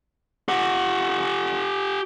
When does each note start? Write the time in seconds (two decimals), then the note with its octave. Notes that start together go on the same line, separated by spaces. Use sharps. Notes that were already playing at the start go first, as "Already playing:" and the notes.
0.48 G4 F#5